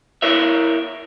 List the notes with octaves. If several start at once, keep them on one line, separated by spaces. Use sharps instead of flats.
E4 A#4 C#5 E5